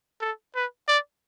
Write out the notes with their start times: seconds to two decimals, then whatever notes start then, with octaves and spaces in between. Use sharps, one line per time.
0.21 A4
0.55 B4
0.88 D5